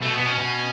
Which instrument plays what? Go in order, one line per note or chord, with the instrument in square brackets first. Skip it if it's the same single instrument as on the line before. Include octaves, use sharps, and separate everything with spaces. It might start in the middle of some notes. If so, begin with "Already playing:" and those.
[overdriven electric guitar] B2 [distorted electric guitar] A3
[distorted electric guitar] B3
[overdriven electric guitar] B2
[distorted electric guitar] C#4
[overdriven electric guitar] B2